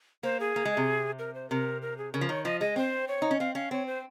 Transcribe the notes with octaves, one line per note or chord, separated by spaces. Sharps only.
A#3 C5
G#4
A#3
G#3
C3
A#4
C5
C3 A#4
A#4
G#4
C#3 A#4
F3
D#3 C#5
F3 D#5
G#3 D#5
C4 C5
C#5
D#4
C#4
C4 F5
C#4 F5
C4 C#5
C5